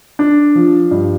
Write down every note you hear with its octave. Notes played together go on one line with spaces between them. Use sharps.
D4
F3
G2